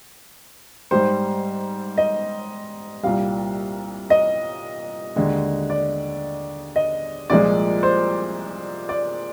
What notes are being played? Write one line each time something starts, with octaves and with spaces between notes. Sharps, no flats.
G#2 G3 C5
D#5
C2 A#2 G3 F5
D#5
D#2 D3 G#3
D5
D#5
C2 A#2 F3 G#3 D5
C5
D5